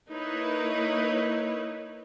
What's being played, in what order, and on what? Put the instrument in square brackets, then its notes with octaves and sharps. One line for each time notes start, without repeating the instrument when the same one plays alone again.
[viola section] A#3 D#4 E4 B4 C#5